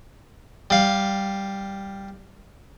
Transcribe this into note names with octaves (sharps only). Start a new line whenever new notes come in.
G3 F5